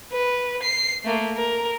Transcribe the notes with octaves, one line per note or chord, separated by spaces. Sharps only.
B4
C7
A3 A#3
A#4